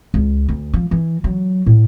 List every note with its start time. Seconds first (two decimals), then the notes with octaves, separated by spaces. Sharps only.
0.14 C#2
0.49 D2
0.73 F3
0.91 E3
1.24 F#3
1.66 A2